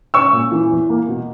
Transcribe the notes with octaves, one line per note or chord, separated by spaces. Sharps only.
C#4 C#6 E6
A#2
E3
E2
A#3
B2